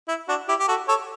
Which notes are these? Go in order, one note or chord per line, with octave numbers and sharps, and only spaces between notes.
E4
D4 F#4
E4 G4
G4
F#4 A4
A4 C#5